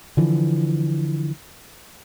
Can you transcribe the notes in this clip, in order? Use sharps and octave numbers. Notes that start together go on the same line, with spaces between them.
D3 E3 F3